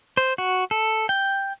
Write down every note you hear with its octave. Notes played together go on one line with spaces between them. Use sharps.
C5
F#4
A4
G5